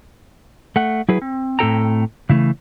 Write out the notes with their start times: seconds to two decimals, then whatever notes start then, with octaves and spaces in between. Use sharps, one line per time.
0.76 A3 F#5
1.08 F#3 E4 G#4 B4
1.22 C4
1.59 A2 C4 E4 A4 G5 A#5
2.29 C#3 E3 A3